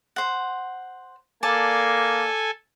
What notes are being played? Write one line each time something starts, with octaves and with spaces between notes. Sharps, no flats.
C5 F#5
A#3 A4 D5 G#5 A5